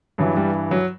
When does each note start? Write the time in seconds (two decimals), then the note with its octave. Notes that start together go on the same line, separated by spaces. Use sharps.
0.18 G2 E3 F#3
0.36 G3
0.71 F#3